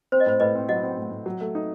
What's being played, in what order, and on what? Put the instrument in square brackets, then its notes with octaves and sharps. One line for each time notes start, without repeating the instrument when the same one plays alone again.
[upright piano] C4 [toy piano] C5
[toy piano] D#5
[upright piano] A2 [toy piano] C5
[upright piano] A2 [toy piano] B4 D#5
[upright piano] C4
[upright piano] F#3 [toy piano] D#5 F#5
[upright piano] C4
A2
A2
F#3
A3
D#4